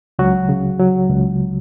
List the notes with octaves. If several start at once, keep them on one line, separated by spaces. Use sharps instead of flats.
C#2 F#3 F#4
C#3
F#3
C#2